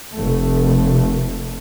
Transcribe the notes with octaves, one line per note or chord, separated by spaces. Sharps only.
F1 A3